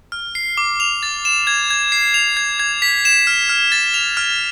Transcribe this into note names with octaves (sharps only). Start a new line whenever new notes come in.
F6
C7
D6
F7
A6
E7
G#6
G#6
C7
F7
G#6
G#6
B6
E7
F6
F6
A6
F7
F6